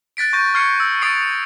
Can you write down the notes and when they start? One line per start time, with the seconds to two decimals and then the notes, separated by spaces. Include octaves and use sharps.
0.17 F#6 A6 B6 D7
0.33 C#6 G6 A#6 D#7
0.54 C#6 F6 G#6 C7 C#7
0.80 E6
1.02 C#6 D#6 A6 C7 D7